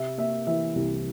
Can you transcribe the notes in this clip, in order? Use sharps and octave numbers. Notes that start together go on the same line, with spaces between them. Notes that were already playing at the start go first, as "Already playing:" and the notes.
Already playing: C3 E5
A#3 E5
E3 E5
C2